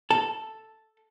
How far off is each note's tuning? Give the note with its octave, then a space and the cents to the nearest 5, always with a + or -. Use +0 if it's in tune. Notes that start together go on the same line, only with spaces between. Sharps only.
A4 +0 A5 +0